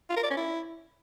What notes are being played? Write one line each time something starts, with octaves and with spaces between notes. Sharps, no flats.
F4
A#4
D5
C#4
E4